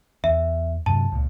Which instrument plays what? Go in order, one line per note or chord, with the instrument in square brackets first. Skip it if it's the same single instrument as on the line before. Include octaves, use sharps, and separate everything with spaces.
[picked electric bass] E2 [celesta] E5
[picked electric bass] G2 C3 F#3 [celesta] A5
[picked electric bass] C#2 A#2